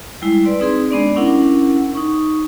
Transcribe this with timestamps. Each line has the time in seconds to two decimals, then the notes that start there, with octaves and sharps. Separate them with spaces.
0.22 G3 G#3 E4
0.45 B4 D5 C6
0.60 C4 D#4 G#4 C6
0.91 G#3 B3 D4 D5
1.16 C#4 D4 E4 A#4 F#5
1.95 D#4 C#6